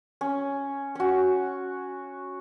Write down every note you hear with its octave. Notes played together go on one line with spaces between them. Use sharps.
C#4
C#4 F#4